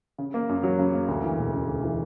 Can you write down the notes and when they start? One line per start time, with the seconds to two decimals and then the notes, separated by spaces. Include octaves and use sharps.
0.18 C#3
0.34 A#3
0.49 F#2
0.63 F#3
0.79 C#3
0.93 A#3
1.08 D2
1.23 E3
1.38 E1
1.53 C#3
1.68 D2
1.83 E3